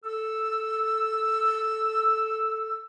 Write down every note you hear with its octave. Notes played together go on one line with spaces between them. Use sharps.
A4 E6